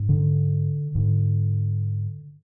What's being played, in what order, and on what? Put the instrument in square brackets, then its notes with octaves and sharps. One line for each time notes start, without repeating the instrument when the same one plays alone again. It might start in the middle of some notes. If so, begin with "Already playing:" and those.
Already playing: [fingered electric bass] G#2
D3
G#2 D3